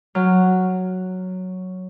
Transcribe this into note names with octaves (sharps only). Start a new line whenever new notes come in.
F#3 F6